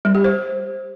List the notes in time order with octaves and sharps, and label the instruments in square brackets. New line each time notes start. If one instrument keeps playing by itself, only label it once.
[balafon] G3
G4
C5